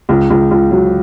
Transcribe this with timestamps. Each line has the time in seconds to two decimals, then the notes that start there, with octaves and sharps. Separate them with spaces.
0.09 C#2
0.30 C#2
0.51 C#2
0.71 F#3